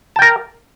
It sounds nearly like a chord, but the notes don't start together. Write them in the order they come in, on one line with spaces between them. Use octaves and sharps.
A5 G5 A#4